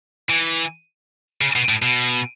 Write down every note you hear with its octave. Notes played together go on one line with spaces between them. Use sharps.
E3
C#3
B2
A2
B2